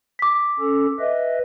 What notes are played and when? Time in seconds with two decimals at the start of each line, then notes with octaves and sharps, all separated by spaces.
0.19 D6 B6
0.60 C#4 A4
1.00 B4 D#5 E5